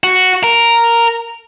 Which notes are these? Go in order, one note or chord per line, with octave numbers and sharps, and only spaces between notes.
F#4
A#4